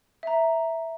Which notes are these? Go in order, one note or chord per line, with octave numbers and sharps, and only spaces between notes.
E5 A#5